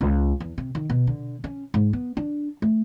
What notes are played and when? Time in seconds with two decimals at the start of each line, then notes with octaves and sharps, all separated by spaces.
0.01 C#2
0.40 E2
0.58 C3
0.75 D#3
0.90 B2
1.07 D3
1.44 C#4
1.74 G#2
1.93 B3
2.17 D4
2.62 A3